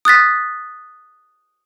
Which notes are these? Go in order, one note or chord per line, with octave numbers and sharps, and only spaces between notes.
D#6 F#6 A6 B6